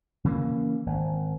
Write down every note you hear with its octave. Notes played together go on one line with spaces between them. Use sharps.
C#3 E3 F#3 A#3
G#1